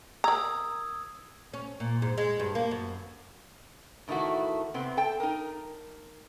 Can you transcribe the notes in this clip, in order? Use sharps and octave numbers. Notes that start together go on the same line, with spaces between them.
A#4 A#5 D#6 E6 G#6
C#4
A#2
G#2
G#3
G2
A#3
F#2
A2 D#3 E3 A3 F#4
C3 B3 C4
A4 G5
D#4 A#4